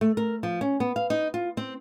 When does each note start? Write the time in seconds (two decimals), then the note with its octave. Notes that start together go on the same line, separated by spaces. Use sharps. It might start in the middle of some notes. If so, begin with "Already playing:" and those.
0.01 A3
0.17 A#4
0.43 F3
0.61 C#4
0.80 B3
0.96 F5
1.10 D#4
1.34 F4
1.57 C4